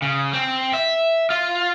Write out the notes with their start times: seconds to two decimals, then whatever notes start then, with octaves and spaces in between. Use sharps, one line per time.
0.02 C#3
0.33 C4
0.73 E5
1.30 F4